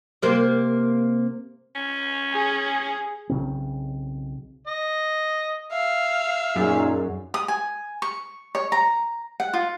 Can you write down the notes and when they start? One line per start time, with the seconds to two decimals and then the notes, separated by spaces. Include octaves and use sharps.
0.22 C3 A#3 C5
1.75 C#4
2.33 G#4
3.29 B1 C#3 C4
4.68 D#5
5.72 E5 F5
6.56 F#2 A#2 D#4 G#4
7.34 D#6
7.48 G#5
8.02 C#6
8.55 C#5
8.72 A#5
9.40 F#5
9.53 F4